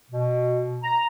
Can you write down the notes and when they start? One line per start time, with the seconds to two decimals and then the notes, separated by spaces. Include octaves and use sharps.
0.11 B2
0.83 A#5